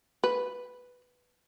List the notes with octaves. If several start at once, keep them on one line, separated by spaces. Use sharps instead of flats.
B4